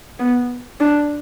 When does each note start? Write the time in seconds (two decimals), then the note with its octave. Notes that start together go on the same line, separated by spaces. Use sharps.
0.19 B3
0.80 D4